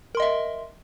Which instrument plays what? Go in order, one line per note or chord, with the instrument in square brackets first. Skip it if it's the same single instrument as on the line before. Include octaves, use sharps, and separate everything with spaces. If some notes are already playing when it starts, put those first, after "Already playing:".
[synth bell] A#4
C6
D#5
E5